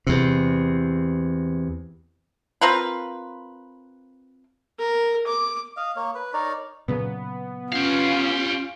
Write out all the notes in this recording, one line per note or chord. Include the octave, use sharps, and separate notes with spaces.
E2 C3
C4 F4 A#4 B4
A#4
D6
D#5 F5
A#3 C#5
B4
D#4 A#4 C#5 D5
A#2 C#3 F#3 B3
C#4 F4 G4 F5